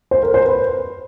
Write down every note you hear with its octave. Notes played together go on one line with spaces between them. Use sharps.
C5
A#4
C5
B4